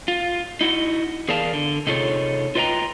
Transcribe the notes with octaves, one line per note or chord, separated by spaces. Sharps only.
F4
D#4 E4 F#4
E2 G#4 A#4 D5 F5 A5
D3
C3 D#4 F4 G#4 A4 C#5
F4 B4 D#5 G5 A#5